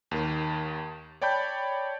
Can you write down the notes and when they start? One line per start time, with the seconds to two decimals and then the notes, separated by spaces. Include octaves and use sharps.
0.11 D#2 D#3
1.21 C#5 D5 G5 A5 B5 G6